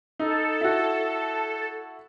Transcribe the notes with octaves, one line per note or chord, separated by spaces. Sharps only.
D#4 A4
E4 F#4